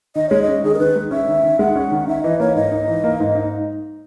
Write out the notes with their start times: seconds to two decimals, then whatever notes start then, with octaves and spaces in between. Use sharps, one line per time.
0.15 D#3 D#5
0.29 G#3 C#5
0.43 D#5
0.48 C#4
0.64 D#3 G#4
0.75 A#4
0.79 D#3 B4
0.95 G#3
1.11 C#4 E5
1.28 D#3
1.43 D#3
1.59 G#3 F#5
1.76 C#4
1.91 D#3
2.07 D#4 E5
2.23 E3 D#5
2.40 A#3 C#5
2.55 G#2 D#5
2.72 D#4
2.88 E3
3.04 A#3
3.20 G#2
3.35 D#4